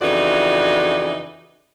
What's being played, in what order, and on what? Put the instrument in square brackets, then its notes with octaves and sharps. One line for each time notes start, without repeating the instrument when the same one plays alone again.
[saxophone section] F2 C#3 E3 D#4 F#4 D5